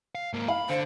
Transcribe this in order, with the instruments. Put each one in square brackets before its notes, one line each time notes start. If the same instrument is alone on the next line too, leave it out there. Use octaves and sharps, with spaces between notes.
[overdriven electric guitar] F5
G#2 A#3
[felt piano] F5 [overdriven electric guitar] B5
[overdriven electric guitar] D3 [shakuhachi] C5